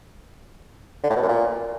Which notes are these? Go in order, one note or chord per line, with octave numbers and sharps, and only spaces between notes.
D3
A2
B2
F#2
A#2